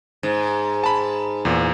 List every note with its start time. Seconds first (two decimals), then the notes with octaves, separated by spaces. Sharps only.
0.23 G#2
0.84 A5 B5
1.45 E2 A#2